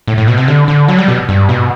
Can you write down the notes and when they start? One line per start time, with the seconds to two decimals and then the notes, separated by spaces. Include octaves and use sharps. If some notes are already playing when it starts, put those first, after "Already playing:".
0.08 A2
0.18 A2
0.28 B2
0.38 C3
0.48 D3
0.68 D3
0.88 F#3
0.98 G3
1.08 B2
1.29 G2
1.49 B2